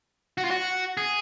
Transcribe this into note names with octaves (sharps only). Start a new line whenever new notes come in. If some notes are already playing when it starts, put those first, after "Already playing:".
F#4
F4
F#4
G#4